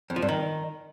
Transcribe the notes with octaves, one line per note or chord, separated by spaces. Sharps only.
F2
F3
G2
D#3